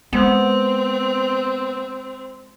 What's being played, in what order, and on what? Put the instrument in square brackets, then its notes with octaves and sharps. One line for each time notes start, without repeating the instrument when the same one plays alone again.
[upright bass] G#3 [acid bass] B3 [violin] C4